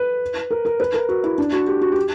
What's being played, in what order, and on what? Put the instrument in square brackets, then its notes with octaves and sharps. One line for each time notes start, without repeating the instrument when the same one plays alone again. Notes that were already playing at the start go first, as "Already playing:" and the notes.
Already playing: [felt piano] B4
A#4
A#4
B4
A#4
F#4
E4
D4
F#4
G4
F#4
G4